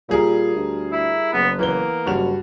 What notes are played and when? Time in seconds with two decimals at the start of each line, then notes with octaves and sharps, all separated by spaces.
0.09 A#2 G3 G#4 A#4
0.55 D2
0.92 E4
1.33 F#1 B3
1.59 E3 A#3 B3 G7
2.06 F#1 G2 F#4 F7